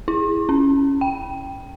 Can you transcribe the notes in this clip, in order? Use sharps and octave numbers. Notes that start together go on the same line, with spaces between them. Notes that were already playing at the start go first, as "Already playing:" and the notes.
E4
C#4
G5